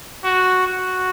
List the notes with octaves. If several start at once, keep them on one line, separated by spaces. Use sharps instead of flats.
F#4
F#4